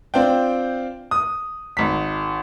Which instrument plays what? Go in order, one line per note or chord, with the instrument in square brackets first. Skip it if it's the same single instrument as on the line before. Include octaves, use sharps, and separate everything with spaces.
[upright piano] C4 D4 F4 G5
D#6
G#1 B6